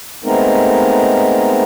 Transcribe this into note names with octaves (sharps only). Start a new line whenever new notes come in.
G#3 A3 B3 C4 D#4 A#4